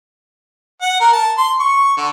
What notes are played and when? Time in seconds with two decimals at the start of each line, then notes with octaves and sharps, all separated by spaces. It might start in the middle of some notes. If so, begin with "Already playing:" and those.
0.81 F#5
1.00 A#4
1.13 A5
1.38 C6
1.60 C#6
1.97 D3